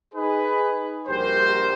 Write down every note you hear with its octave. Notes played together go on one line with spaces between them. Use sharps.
D#4 G#4 B4
A#1 G3 F#4 G4 A#4 C5